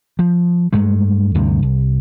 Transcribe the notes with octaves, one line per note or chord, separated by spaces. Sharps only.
F3
G2 G#3 A3
D2 G2 C3
C2